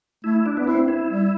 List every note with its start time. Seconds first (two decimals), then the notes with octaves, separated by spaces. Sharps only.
0.24 A3 E4
0.46 D4
0.57 B3
0.67 C4 E4
0.88 E4
1.10 G3